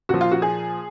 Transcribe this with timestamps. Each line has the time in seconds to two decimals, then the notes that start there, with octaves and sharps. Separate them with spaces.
0.09 A#2 F3 F#4
0.21 F4
0.32 F#4
0.42 G#4